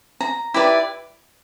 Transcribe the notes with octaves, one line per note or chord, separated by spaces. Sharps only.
A#5
E4 G4 B4 D5